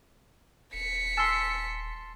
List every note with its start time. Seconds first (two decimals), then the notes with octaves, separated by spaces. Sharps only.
0.73 D#1 B6 C#7
1.17 G#5 A5 C6 E6 F6